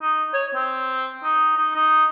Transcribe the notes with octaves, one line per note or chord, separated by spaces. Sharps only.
D#4
C#5
C4
D#4
D#4
D#4